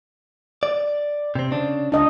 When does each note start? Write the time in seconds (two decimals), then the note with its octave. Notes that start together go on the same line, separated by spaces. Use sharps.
0.63 D5
1.35 C3 C4
1.52 C#3 D4
1.92 C#2 D4 D#5